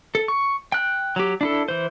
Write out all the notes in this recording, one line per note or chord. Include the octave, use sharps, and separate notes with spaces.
A4
C#6
G5 F#6
F#3 G4
D4 E4 A4
E3 C5